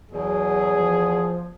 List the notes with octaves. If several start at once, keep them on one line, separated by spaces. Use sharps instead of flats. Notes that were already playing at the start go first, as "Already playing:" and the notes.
E2 B2 F#3 G#4
F3